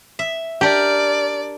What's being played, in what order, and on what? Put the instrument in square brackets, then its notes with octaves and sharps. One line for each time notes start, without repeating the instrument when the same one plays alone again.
[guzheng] E5
[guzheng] D4 A#4 [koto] G4 [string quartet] D5